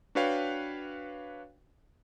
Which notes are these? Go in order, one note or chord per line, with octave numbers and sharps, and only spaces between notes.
D4 F#4 B4 C#5 F5 G5